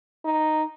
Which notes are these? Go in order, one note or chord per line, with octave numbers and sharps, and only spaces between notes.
D#4